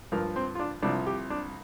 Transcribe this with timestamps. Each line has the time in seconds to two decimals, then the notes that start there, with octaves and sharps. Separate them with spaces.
0.12 G2 F3 A#4
0.36 C4
0.55 F4
0.59 D4
0.82 C2 C3 F3 D4
1.06 G4
1.30 D4